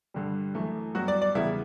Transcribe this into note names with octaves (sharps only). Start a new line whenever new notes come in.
G2 D3 G3
F#2 E3 A3
G2 F#3 B3 F#4
D5
D5
E2 C#3 G3 B3 E4